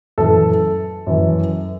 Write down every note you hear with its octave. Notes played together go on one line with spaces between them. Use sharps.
F#2 E3 A4
F#2 E3